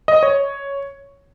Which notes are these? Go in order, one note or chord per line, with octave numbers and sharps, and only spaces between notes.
D#5
C#5